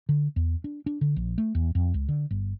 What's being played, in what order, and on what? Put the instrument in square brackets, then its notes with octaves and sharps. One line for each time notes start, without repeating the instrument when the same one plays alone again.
[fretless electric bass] D3
E2
D4
D4
D3
A#1
A3
E2
F2
C#2
D3
G1